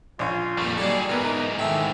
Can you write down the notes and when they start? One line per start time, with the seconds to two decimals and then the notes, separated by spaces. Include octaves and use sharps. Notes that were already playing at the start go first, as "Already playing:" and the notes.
0.19 A#1 C#4 F4
0.58 F2 A#2 G3 A3
0.78 F#3 G3 D#4 G#4 A4 D5
1.10 G#2 E3 B3 A#4
1.24 D#4 A#4
1.59 D#3 A3 E5 G5